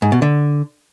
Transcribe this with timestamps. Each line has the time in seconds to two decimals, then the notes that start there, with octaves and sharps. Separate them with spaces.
0.02 G#2
0.12 B2
0.22 D3